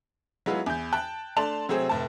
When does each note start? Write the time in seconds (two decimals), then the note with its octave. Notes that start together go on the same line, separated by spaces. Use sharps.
0.46 F#3 G#3 B3 E4 F4 B4
0.66 E2 G6
0.93 G5 A5 F#6
1.36 A3 D4 A5 C6 F7 F#7
1.69 C3 F#3 A3 C4 G#4 C5
1.89 F1 A2 A5